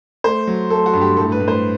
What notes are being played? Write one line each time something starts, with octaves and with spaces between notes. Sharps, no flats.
A3 C5
F#3
A3 A4
F#4
G2
G4
A2 A4
B4
A2
C5